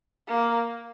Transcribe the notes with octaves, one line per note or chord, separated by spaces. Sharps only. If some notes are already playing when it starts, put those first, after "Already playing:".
A#3